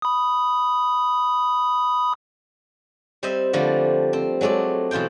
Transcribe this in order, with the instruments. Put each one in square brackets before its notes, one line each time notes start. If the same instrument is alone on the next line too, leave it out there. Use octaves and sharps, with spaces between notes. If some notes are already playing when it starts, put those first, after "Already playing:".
[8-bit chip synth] B5 D#6
[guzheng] G3 C4 C5 D#5 E5
D3 F3 G3 A3 A#3
C4
F#3 G#3 A3 A4 D5
B2 E3 F4 C5 G5